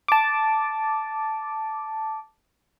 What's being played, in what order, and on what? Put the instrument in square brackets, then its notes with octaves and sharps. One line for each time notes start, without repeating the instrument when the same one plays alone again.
[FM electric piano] A5 D6